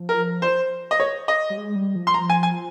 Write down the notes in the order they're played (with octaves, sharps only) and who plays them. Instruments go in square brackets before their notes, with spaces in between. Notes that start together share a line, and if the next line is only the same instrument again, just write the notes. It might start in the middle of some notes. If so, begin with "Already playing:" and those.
Already playing: [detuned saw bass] F3
[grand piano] A#4
C5
D#5
C#5
D#5
[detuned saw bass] G3
G#3
G3
F3
[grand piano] C6
A#5
G#5
G#5